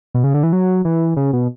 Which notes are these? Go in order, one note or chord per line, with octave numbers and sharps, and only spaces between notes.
B2
C#3
D3
E3
F#3
E3
C#3
B2